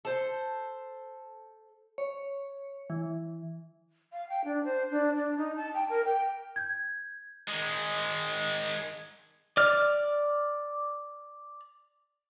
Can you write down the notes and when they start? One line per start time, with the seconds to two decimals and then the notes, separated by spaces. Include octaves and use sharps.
0.05 A4 C5
1.98 C#5
2.90 E3
4.13 F5
4.29 G5
4.45 D4
4.64 C5
4.91 D4
5.16 D4
5.37 D#4
5.57 A5
5.74 G5
5.90 A#4
6.05 G5
6.56 G6 G#6
7.48 D#3 G#3
9.57 D5 F6